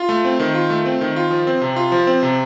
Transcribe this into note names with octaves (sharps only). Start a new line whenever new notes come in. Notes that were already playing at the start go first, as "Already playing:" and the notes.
Already playing: F4
A3
C4
D#3
F4
A3
C4
D#3
F4
F3
C4
C3
F4
F3
C4
C3